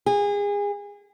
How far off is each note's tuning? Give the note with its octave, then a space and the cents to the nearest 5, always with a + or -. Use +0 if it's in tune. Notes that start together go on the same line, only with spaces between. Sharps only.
G#4 -30